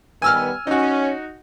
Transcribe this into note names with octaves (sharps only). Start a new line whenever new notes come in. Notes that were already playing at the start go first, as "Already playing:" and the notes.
D#3 G3 B3 G#5 E6 F6
C#4 D#4 F#4